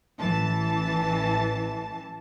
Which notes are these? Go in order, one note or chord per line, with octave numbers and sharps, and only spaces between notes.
A1 E3 A5